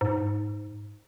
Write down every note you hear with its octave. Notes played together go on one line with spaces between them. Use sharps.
G#2